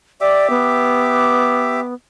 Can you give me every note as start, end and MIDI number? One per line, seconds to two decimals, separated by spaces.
0.21 1.80 67
0.21 0.50 74
0.21 1.80 76
0.21 1.80 86
0.50 1.94 59